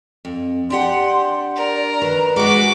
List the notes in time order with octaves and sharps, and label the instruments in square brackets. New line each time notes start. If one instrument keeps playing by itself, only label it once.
[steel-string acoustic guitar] F2
[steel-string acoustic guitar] D4 G4 F#5 [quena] C6
[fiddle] A#4 [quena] D5
[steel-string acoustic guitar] D#3 [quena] B4
[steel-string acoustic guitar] G#3 B3 [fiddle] F#4 D6